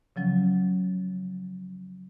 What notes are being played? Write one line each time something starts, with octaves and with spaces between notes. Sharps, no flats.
C#3 F3 F#3 C#4